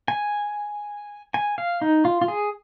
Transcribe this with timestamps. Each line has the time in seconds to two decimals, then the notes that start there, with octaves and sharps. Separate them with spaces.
0.08 G#5
1.34 G#5
1.58 F5
1.81 D#4
2.05 F4
2.22 F4
2.28 G#4